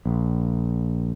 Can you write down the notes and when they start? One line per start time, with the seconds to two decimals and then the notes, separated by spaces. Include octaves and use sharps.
0.06 A#1